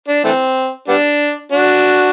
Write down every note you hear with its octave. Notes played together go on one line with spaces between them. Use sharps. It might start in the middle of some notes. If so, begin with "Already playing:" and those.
D4
E3 A3 C4
G3 B3 D4
D4 F#4